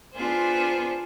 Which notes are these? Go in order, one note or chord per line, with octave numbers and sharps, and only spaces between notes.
B3 D4 F4 G#4 C5